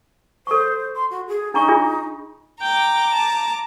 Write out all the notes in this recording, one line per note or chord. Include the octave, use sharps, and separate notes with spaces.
A4 C5 C#6
C6
F#4
G#4
D4 D#4 A#5 C#6
D4 F4 G#4
G5 A#5 D6
A5